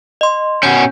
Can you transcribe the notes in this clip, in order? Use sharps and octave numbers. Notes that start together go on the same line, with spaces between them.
D#5 C6
B2 C#4 G6